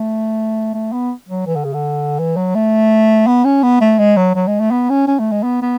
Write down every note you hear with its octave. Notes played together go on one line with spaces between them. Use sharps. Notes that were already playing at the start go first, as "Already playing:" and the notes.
Already playing: A3
A3
B3
F#3
E3
D3
C#3
D3
E3
F#3
A3
B3
C#4
B3
A3
G#3
F#3
F#3
G#3
A3
B3
C#4
C#4
A3
G#3
B3
B3